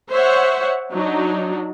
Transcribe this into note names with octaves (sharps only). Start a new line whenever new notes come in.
C5 C#5 E5 F#5
F#3 D4 D#4